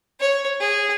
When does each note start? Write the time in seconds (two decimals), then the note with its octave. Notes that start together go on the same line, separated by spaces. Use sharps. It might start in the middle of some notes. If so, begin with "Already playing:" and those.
0.20 C#5
0.60 G#4